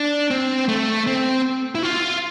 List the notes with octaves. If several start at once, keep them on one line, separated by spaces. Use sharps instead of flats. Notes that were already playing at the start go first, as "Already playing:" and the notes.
Already playing: D4
C4
A3
C4
E4
F4